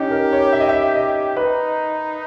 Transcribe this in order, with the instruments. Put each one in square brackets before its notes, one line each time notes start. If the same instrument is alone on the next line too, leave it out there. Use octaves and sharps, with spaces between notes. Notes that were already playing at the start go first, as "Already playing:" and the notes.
Already playing: [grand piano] C#4 D#4 [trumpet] G4
[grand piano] A#4
C#5
E5
D#5
E5
D#5
[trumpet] D#4 [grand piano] B4